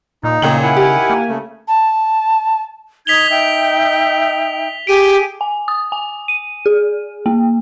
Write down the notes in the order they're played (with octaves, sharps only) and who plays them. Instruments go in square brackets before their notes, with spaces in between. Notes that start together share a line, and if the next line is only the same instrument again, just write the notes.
[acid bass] A#2 [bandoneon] D#4
[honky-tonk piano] A#2 G5 F#7 [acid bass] C#3
[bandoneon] D#3 E4 F#5 [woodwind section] G#5
[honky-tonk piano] G4
[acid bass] A#3
[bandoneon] C#3 A3
[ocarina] A5
[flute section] D#4 D#6 G#6 [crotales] B6 F7 G7
[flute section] D#4 E5 G5
[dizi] G4 [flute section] G#4 [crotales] D7 D#7
[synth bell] G#5
D#6
G#5
D#7
G#4
A#3